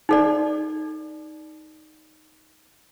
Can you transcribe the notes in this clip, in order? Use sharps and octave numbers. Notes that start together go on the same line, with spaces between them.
D#4 A4 D5